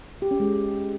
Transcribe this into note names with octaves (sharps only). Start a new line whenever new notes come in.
G4
C#4
G#3